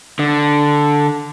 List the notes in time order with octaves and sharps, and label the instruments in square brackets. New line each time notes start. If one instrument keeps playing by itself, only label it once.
[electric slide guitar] D3